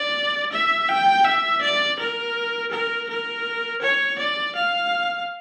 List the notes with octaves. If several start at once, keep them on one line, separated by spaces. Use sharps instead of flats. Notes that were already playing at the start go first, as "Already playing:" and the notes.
Already playing: D5
E5
G5
E5
D5
A#4
A#4
A#4
C#5
D5
F5